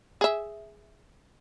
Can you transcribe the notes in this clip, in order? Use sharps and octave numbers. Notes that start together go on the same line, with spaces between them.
G#4 E5